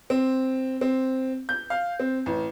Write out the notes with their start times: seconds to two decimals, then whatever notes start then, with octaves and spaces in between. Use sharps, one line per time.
0.10 C4
0.81 C4
1.49 G6
1.70 F5
1.99 C4
2.26 A1